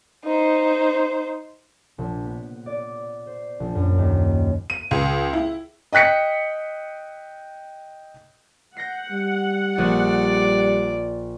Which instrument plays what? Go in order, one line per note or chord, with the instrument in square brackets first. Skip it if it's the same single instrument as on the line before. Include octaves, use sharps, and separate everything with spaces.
[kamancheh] D#4 C5
[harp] A#1
B3
D5
C5
A#1
F#2
D#2
[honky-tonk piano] D#7
C#2
E4
[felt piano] D#5 G5 F#6 B6 C#7
[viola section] F#5 [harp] G6 A#6 C7
[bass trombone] G3
[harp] A#1 G#4 [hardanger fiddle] D5